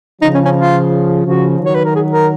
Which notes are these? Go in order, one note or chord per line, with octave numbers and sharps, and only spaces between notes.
C#3 F3 D#4
C#4
C#4
F4
C#3 F3 F#4
D#3 F#3
C#5
B4
A#4
G#4
A#4